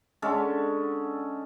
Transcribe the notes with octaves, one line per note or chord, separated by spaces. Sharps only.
D3 G#3 C#4 A4